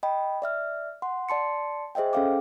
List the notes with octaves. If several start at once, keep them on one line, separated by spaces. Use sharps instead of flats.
D#5 G5 B5
D5 E5 F6
F#5 C6
D5 A5 C6 C#7
G#4 C5 D#5 E5 G5
C#4 G#4 A4 F5 G5 D6